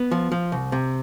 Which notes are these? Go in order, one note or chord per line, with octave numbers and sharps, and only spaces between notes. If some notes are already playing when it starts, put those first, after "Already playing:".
Already playing: B3
F3
F3
C2
C3